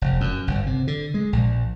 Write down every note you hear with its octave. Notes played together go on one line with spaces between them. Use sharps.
F1
F#2
G1
C3
D3
G#3
A#1